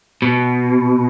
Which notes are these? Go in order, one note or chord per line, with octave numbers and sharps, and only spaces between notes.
B2